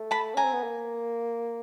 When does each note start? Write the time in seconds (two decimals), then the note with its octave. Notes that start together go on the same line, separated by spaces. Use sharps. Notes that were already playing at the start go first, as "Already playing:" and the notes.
Already playing: A3
0.11 A5 B5
0.34 C#4 G#5 A#5
0.44 C4
0.53 B3
0.63 A#3